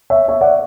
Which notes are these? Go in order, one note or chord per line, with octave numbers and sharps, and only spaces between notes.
C#5 E5
C#5 E5
D5 F#5